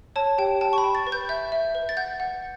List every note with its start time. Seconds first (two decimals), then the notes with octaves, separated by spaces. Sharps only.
0.16 C#5 A5
0.38 G4 G5
0.61 G5 A5
0.73 C#6
0.78 B5
0.84 G5
0.95 A6
1.07 B4
1.12 G6
1.29 E5 G6
1.52 E5
1.75 B4
1.89 A6
1.97 F#5 G6
2.20 F#5